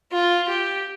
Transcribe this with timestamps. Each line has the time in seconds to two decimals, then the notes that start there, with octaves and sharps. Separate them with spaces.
0.12 F4
0.48 G4